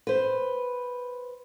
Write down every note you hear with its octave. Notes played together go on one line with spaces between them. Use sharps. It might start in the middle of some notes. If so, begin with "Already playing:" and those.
B4 C5